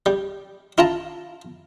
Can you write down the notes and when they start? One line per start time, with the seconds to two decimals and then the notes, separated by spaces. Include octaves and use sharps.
0.06 G3
0.78 E4 F4 A5 A#5